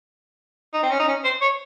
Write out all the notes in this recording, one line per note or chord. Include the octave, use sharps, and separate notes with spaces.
D#4
C4
C#4
D#4
C#4
C5
C#5